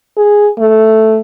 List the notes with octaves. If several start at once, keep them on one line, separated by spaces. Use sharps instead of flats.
G#4
A3